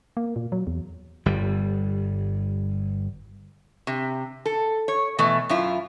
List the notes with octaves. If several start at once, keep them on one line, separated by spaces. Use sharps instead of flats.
A#3
A#2
F#3
E2
G1 G3
C3
A4
C#5
B2 E3 A3
F#2 E4 F4